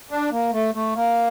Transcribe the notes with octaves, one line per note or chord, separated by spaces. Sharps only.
D4
A#3
A3
A3
A#3